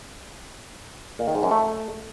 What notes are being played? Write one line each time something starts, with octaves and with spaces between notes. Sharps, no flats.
A#2
D#3
G#2
F#2
A3